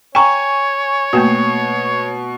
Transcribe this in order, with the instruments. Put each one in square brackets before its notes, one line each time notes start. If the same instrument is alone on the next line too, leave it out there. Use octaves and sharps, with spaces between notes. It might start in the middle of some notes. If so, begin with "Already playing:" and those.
[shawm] C#5 [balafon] G5 A#5 [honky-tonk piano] G#5 C#6
[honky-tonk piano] B2 [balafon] A3 A#3 F#4